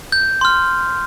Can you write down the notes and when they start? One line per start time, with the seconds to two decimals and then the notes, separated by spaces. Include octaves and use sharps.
0.12 G6
0.41 C6 F6